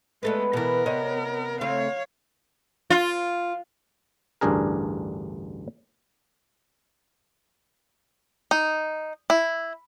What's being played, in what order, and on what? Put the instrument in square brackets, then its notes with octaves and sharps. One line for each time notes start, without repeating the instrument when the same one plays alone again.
[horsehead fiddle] G#3 A3 [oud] B3 A4 B4
[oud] B2 E3 [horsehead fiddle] B3 A#4
[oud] C3 C#5 D#5
[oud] C#3 A3 C4 [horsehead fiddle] C#5 F5
[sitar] F4
[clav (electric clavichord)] A1 D2 G2 D4 G#4 A#4
[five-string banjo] D#4
E4